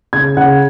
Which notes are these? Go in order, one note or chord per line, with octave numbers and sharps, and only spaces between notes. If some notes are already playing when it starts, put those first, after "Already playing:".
C#3 G#6
C#3 F#5